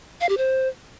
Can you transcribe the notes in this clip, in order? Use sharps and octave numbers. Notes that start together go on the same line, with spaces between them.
F5
G4
C5